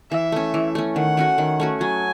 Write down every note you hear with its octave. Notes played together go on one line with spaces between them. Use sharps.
E3 E5
A3 C#4
E3
A3 C#4
D#3 F#5
A3 C#4 F#4
D#3
A3 C#4 F#4
F#3 G#5